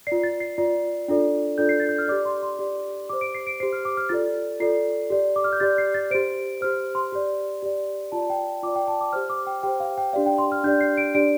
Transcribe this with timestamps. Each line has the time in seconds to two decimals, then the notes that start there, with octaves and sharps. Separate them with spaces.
0.07 F4 D5 C7
0.24 A6
0.40 C7
0.58 F4 D5
1.08 D4 F4 A4 D5
1.58 D4 F4 A4 D5 G6
1.69 C7
1.80 A6
1.89 G6
1.99 F6
2.08 G4 D5 D6
2.25 C6
2.43 C6
2.59 G4 D5
3.09 G4 C5 D6
3.21 D7
3.35 C7
3.47 D7
3.60 G4 C5 C7
3.73 F6
3.85 D6
3.97 F6
4.09 F4 A4 D5 A6
4.60 F4 A4 D5 C7
5.10 G4 D5
5.36 D6
5.44 F6
5.53 G6
5.60 G4 D5 A6
5.78 C7
5.94 A6
6.11 G4 C5 D7
6.61 G4 C5 F6
6.95 C6
7.12 G4 D5
7.62 G4 D5
8.12 F4 D5 A5
8.30 G5
8.63 F4 D5 D6
8.76 G5
8.88 A5
9.01 D6
9.13 G4 C5 F6
9.30 D6
9.47 G5
9.63 G4 C5 G5
9.80 F5
9.98 G5
10.13 D4 G4 D5 F5
10.26 G5
10.38 C6
10.52 F6
10.63 D4 G4 D5 G6
10.81 C7
10.97 D7
11.15 D4 G4 D5 D7